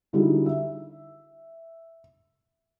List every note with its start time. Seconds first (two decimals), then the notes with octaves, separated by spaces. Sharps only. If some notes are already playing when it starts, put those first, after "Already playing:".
0.13 D3 G3 D#4 E4 F#4 G#4
0.46 E5